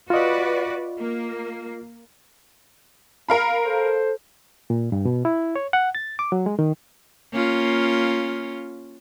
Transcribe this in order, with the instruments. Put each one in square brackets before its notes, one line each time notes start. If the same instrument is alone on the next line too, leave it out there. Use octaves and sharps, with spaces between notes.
[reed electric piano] F4 D#5 [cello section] F#4 B4 D5
[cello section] A#3
[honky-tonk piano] A#4 F5 B5
[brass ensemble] A4 C5
[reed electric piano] A#2
G2
B2
E4
C#5
F#5
A6
D6
F#3
G#3
D#3
[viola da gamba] A#3 C#4 F4